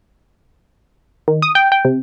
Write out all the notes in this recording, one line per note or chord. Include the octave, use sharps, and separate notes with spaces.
D#3
D#6
G5
G5
C3